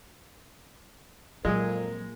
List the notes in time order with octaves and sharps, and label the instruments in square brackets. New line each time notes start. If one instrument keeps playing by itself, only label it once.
[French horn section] F2 A#4 [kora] A#2 G#4 [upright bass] F#3 [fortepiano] G#3